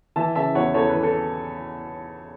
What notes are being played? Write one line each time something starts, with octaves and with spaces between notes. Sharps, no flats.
E3 E5 A5
C#3 E5 A5
E2 C#5 F#5
E2 A4 C#5
E3 B4
A4